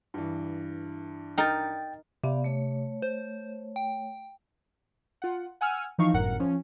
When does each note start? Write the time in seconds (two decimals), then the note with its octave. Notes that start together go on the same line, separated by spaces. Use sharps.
0.14 G2 E3
1.38 D#4 A#4 G5 A6
2.24 C3 B3 D5 F5
2.44 A3 C#5
3.02 C5
3.76 G5
5.22 F4 F#5
5.61 F#5 G#5 E6 F6
5.98 E3 F3 D#4 F5 C#6
6.13 G1 F#2 A2 A#4 F#5
6.40 F3 C#4